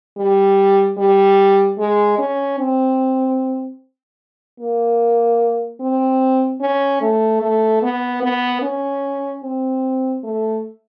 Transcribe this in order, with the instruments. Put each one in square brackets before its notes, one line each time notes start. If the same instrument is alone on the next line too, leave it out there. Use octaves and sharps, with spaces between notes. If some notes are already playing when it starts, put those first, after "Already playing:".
[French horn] G3
G3
G#3
C#4
C4
A#3
C4
C#4
A3
A3
B3
B3
C#4
C4
A3